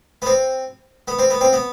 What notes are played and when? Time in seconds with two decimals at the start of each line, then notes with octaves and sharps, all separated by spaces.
0.22 B3
0.26 C4
1.08 B3
1.19 C4
1.30 B3
1.41 C4
1.53 B3